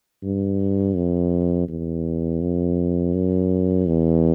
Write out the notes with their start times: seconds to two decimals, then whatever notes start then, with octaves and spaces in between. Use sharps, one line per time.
0.23 G2
0.96 F2
1.68 E2
2.41 F2
3.14 F#2
3.87 E2